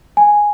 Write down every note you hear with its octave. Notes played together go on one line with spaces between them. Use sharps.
G#5